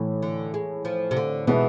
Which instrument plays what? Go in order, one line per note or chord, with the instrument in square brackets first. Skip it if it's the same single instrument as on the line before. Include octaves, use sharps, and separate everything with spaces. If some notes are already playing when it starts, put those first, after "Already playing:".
Already playing: [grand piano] A2 E3 A3
[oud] D3
G#3
F3
C3
D3
[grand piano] B2 G#3 B3 [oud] E3